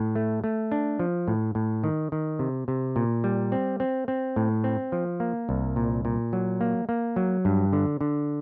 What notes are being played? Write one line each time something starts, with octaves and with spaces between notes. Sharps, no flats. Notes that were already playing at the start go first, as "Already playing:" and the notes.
Already playing: A2
A3
A3
D4
F3
A2
A2
D#3
D#3
C3
C3
A#2
G3
C4
C4
C4
A2
C4
F3
A#3
C2
A#2
A#2
F#3
A#3
A#3
F#3
G2
D3
D3